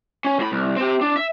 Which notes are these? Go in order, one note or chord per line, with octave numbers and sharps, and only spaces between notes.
C#4
A2 B5
C2
C4 G4
D4
E5